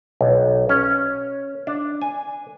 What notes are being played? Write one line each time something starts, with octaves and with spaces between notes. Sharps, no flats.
B1
C#4
D4
G#5